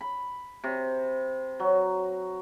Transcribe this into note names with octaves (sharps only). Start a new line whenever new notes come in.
B5
C3
F#3